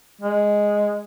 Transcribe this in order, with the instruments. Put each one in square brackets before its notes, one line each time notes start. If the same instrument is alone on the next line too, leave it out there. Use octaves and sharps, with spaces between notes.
[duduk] G#3